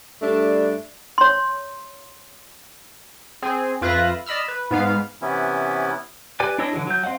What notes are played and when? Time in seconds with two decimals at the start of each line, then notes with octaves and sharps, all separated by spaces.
0.22 G2 A3 D4
1.18 C#5 C6
3.42 C4 G#4
3.81 F2 F4 B4 E5 F#6 A#6
4.26 D5 D#5 B5 E6 F6
4.48 B4
4.71 G#2 B3 F5
5.21 C3 E3 B3 C#4 E4
6.40 G4 B4 D5 G#5
6.58 D4 E4 C#5 D#5 E6
6.73 D3 E3 F#3 G#4
6.87 F#3 G6
7.04 C4 C5 D#5 F5 F#5